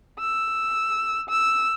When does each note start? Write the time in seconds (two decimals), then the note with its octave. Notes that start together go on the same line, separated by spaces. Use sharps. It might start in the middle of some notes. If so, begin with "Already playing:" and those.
0.20 E6
1.29 E6